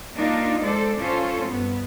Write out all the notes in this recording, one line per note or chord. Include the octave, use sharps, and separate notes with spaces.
A#3 D4 D#4 F4
G#3 A4 C5 D5
C#4 F4 A4 C5
G2 B3